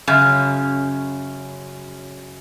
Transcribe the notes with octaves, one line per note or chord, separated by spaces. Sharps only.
F#2 C#3